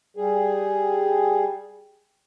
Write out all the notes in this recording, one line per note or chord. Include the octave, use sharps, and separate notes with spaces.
G3 G#4